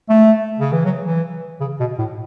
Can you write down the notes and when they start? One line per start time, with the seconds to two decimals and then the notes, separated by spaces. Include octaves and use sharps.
0.09 A3
0.59 C#3
0.72 E3
0.85 F#3
1.04 E3
1.60 C#3
1.80 B2
1.98 A2